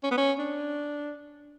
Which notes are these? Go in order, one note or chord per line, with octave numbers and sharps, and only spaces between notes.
C#4
B3
C#4
D4